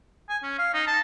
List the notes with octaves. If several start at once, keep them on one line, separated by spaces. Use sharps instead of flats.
G#5
C#4
F5
D#4
A5